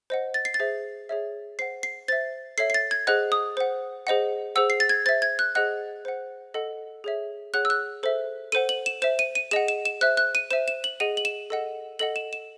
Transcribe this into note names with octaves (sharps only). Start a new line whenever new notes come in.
C5 D#5 F#5
A6
C7
A6
G#4 C5 E5
G#4 C#5 E5
C5 F#5 C7
C7
C5 E5 A6
A4 C#5 E5 C7
C7
A6
G#6
G#4 C5 D#5 F#5 F#6
D#6
C5 F#5
G#4 C5 D#5 F#5
G#4 C5 F#5 E6
C7
A6
G#6
C5 E5 A6
G#6
F#6
G#4 C5 D#5 F#5 F#6
C5 F#5
A4 D#5 F#5
G#4 C#5 E5
G#4 C#5 F#5 F#6
E6
F#6
A4 C5 E5
A4 C5 F#5 D#7
F#7
E7
C5 E5 E7
D#7
D#7
G#4 D#5 F#5 E7
E7
E7
C5 E5 F#6
F#6
D#7
C5 E5 E7
E7
F#7
G#4 D#5 F#5 D#7
F#7
E7
A4 D#5 F#5
A4 D#5 F#5 F#7
E7
E7